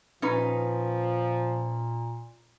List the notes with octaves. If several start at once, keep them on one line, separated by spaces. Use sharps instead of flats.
A#2 F3 C#4 D#4 B4